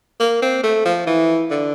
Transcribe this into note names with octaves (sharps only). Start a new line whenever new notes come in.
A#3
C4
A3
F3
E3
D3